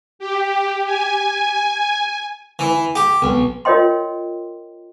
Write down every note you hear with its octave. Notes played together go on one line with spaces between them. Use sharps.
G4
G#5
E3
G4
B1
F4 A#4 C#5 D#5 G5 C6